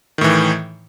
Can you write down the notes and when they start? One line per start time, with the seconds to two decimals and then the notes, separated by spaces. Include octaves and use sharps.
0.18 D#3
0.21 A2
0.24 E3